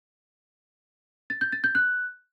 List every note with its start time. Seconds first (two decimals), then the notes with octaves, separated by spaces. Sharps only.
1.30 A6
1.41 G6
1.52 A6
1.64 G6
1.75 F#6